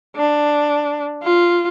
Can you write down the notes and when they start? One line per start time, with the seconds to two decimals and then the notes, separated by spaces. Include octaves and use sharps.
0.16 D4
1.23 F4